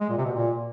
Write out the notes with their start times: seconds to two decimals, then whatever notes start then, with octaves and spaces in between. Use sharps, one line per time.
0.01 G#3
0.09 A#2
0.18 C3
0.26 B2
0.34 A#2